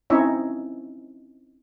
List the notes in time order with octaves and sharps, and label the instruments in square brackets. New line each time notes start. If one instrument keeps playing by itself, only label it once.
[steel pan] C4 C#4 D#4 E4 C#5 E5